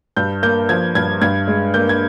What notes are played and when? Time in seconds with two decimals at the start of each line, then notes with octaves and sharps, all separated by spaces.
0.17 G2 G6
0.43 A#3 G6
0.69 F3 G#6
0.95 G2 G#6
1.22 G2 G#6
1.47 G#3
1.74 A#3 G6
1.89 G#6